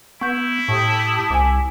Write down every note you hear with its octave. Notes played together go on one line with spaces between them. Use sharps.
B3 E4 C#6 G6
A2 G4 A5 C#6 D#6
C2 G#5 D6